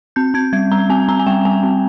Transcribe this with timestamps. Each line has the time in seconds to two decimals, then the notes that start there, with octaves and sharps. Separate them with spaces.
0.16 C4 G6
0.34 C4 G#6
0.53 G3 G#6
0.72 G3 A#5
0.89 C4 G#5
1.08 C4 A#5
1.19 G#5
1.27 G3 G5
1.45 G3 G#5
1.63 C4